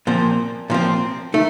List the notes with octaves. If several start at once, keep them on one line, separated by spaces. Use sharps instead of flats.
A#2 F3 C4
A#2 F3 C4
A3 D#4